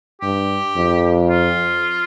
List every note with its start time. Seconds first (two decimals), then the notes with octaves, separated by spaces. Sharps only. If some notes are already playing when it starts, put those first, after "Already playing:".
0.22 G2 G4
0.76 F2
1.30 F4